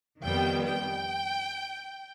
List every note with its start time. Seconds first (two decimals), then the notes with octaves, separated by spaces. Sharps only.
0.22 F2 D#3 G3 B3 G5
0.67 G5